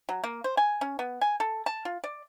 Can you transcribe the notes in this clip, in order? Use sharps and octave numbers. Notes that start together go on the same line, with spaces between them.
F#3
A#3
C5
G#5
C#4
B3
G#5
A4
A5
F4
D5